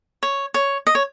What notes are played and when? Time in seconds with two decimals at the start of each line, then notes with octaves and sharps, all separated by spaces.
0.23 C#5
0.54 C#5
0.87 D#5
0.95 C#5